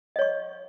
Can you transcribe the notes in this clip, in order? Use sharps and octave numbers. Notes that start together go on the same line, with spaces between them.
C#5 D#5 C#6